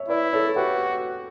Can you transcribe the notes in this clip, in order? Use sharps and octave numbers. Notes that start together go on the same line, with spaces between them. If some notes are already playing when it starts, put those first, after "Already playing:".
Already playing: C#5 E5
E4 B4 D5
A4 C#5
A4
F#4 G4 B4